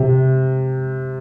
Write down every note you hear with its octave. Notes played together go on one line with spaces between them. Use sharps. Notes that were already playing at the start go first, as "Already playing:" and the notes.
Already playing: C3